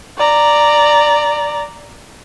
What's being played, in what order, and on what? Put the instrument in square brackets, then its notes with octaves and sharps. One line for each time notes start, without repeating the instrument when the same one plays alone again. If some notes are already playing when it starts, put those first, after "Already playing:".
[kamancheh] D5 A#5